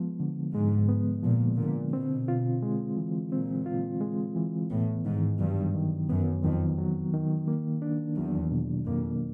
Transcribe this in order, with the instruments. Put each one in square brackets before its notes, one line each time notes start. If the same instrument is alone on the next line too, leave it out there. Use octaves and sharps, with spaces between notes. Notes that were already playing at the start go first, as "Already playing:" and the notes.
Already playing: [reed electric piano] F3 G#3 B3
D3
[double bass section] G#2 [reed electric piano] G#3
[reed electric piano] B3
[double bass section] A#2 [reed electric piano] F3
[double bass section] A#2 [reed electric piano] D3
[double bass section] B2 [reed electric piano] C4
[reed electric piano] F4
G#3
E3
[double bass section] A#2 [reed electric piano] C4
[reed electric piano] F4
G#3
E3
[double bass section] A2 [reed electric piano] B3
[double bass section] G#2 [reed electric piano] D#3
[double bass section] G2 [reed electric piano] F#3
[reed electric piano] D#3
[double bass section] F#2 [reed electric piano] B3
[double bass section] F2 [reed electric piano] D#3
[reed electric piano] F#3
D#3
A#3
D4
[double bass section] E2 [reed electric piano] F#3
[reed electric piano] B2
[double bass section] F2 [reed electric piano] A#3